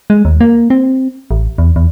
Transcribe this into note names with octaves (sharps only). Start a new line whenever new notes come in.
G#3
D#2
A#3
C4
A1
E2
E2